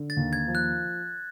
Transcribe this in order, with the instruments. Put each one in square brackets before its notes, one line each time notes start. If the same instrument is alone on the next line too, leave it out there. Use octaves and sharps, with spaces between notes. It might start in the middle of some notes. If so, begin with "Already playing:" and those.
Already playing: [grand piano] D3
[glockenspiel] A6
[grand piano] D#2
[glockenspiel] G#6
[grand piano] F3
[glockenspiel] F#6